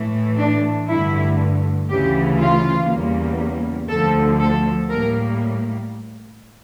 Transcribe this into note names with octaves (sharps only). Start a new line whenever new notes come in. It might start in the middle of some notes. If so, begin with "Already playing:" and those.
Already playing: A2 E3 A3
D4
G2 D3 A3 E4
D2 C#3 E3 G4
F4
E2 C#3 G3 A#3
D2 D3 F3 A3 A4
A4
A2 G3 A#3 A#4